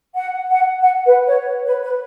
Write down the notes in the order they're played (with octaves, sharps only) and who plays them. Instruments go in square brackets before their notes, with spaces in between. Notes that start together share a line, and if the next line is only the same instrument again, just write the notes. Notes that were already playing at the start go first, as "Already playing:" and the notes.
[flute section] F#5
F#5
F#5
B4
C#5
B4
B4